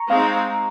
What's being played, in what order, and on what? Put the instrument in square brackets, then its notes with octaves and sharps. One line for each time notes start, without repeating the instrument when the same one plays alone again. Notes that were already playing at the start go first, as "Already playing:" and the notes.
Already playing: [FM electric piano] A#5 C#6
[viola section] G#3 C4 D#4 [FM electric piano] F5